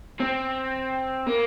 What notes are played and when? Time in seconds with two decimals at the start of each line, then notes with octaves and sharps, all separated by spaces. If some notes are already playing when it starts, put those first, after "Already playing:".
0.20 C4
1.27 A#3